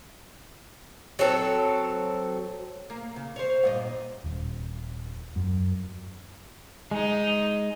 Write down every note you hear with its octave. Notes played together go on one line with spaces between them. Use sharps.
F#3 C4 A4
A#3
C#3
C5 C#5
G2 A#2 D#5
D#1
F#2
G#3 D#4